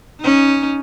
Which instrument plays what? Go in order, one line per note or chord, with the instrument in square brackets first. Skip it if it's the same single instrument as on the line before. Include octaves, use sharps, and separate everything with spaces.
[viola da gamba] C#4 D#4